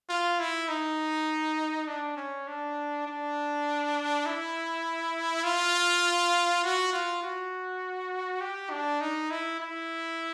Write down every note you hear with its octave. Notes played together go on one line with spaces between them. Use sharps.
F4
E4
D#4
D4
C#4
D4
D4
E4
F4
F#4
F4
F#4
G4
D4
D#4
E4
E4